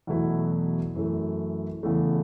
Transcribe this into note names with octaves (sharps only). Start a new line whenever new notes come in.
E2 B2 F#3 A3 E4
F#2 E3 A3
E2 C#3 E3 A3